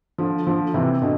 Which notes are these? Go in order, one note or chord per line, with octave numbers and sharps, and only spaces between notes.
D3 F3
D3 F3
C3 E3
B2 D3